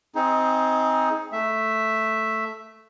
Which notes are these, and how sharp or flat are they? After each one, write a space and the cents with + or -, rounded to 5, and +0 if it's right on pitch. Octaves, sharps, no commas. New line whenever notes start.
C4 +0 D#4 +20 G#4 +5
A3 +0 E5 +0